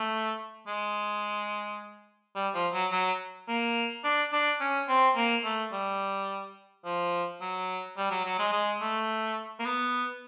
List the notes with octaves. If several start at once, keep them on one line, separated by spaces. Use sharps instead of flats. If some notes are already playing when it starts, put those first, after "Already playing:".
Already playing: A3
G#3
G3
F3
F#3
F#3
A#3
D4
D4
C#4
C4
A#3
A3
G3
F3
F#3
G3
F#3
F#3
G#3
G#3
A3
A#3
B3